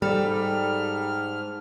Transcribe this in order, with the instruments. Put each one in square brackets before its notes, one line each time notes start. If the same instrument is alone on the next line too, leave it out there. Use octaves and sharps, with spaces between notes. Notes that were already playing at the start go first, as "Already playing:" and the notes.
[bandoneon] G#2 F6 [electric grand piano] G3 [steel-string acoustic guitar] A4